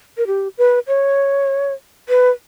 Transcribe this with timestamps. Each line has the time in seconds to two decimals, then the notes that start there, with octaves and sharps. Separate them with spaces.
0.17 A#4
0.27 G4
0.58 B4
0.88 C#5
2.09 B4